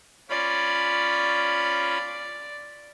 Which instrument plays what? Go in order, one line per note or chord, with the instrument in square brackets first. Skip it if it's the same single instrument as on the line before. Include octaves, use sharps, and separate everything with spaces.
[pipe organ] C#4 F4 B5 [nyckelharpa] D5